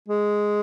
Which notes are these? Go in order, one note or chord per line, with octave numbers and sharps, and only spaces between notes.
G#3